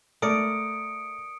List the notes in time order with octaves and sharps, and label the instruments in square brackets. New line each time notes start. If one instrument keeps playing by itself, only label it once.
[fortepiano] A3 [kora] A#4 D5 [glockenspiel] D#6 C#7 D7